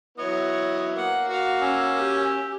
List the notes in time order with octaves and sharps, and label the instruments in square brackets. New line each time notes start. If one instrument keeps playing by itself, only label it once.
[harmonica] F#3 B3 E4 [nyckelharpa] C#5 [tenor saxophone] D#5
[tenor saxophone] A#3 [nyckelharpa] F#5
[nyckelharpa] F#4 F5
[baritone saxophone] C#4 [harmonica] E6
[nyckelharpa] G4